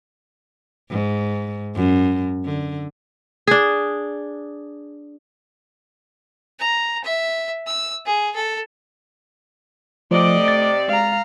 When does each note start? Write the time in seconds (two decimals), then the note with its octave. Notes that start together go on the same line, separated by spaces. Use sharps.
0.90 G#2
1.75 F#2
2.45 D3
3.47 D4 G#4
6.60 A#5
7.04 E5
7.67 E6
8.06 G#4
8.35 A4
10.11 C3 F3 A3 D5 D#5 D6
10.48 A6
10.88 G#3 F5 A#5